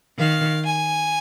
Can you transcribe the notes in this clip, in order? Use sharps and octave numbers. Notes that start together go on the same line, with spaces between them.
D#3 F5
G#5